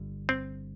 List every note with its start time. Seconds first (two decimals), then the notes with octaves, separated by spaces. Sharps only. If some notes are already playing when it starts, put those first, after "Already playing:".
Already playing: G1 G2 D3 G3
0.29 C4